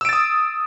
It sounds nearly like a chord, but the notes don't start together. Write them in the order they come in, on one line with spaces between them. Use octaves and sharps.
E6 D7 A6 D#6